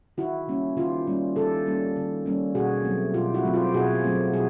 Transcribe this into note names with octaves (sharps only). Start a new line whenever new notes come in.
D#3 E4 F#4
G3 A#3 C#4
D#3 F4 G4
G3 A#3 C#4
D#3 G4 A4
G3 A#3 C#4
D#3
G3 A#3 C#4
B2 F#4 G#4
F#3 A3 C4
B2 F4 G4
E4 F#4
F#3 A3 C4
F4 G4
B2 F#4 G#4
F#3 A3 C4
B2 F#4 G#4